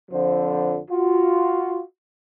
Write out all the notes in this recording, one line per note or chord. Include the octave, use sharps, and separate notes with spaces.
F2 D3 F3 C5
F4 F#4